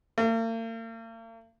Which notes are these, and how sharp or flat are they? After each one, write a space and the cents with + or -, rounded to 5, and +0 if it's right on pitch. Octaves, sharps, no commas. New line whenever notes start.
A#3 -45